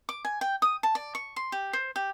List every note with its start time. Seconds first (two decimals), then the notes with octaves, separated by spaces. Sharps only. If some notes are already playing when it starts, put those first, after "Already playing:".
0.09 D6
0.25 G#5
0.41 G5
0.62 D#6
0.83 A5
0.95 D5
1.15 C#6
1.36 C6
1.52 G4
1.73 C5
1.96 G4